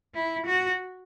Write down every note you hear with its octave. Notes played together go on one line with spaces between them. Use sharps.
E4
F#4